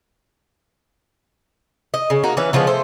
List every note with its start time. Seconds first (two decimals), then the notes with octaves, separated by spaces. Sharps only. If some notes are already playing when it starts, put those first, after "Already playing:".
1.94 D#5
2.10 C#3
2.23 A#3 D#4 F#4
2.37 E3 C#4 B4
2.53 C#3 F3 G#3 B3
2.67 A3 C5